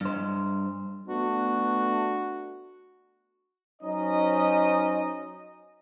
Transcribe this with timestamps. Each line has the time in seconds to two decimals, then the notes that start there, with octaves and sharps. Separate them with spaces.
0.01 G2 C5
1.08 A3 B3 D4 F#4
3.82 F#3 C#4 D#4 C5 D#5